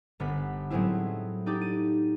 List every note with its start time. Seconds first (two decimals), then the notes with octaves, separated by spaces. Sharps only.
0.20 G1 B3 B5 B6
0.70 A2 F#3 G#3 B3 C4 E4
1.46 D4 D#4 G4 D5
1.61 D#7